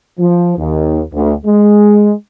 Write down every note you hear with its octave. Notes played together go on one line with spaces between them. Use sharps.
F3
D#2
D2
G#3